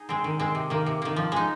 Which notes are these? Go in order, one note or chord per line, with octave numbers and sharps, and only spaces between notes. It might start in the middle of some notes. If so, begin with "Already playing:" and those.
Already playing: D#4 G#4
G#3 C4
D#3
G#3 C4
C3
D#3 A#3
C3
D#3 A#3
F3
G#3 D#4